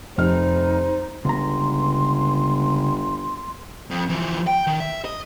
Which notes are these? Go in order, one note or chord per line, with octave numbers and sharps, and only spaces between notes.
F1 F2 D#4 C5 F6
G1 C#2 A#5 C6
F2
E3 F3
G5
D#3
E5
D#5